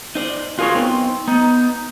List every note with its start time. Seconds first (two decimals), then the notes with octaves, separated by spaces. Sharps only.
0.15 D#4 C5 D5
0.59 F4 F#4 G#4 A#4 B4 C#5
0.75 B3 C4 D#4
1.28 B3 D#4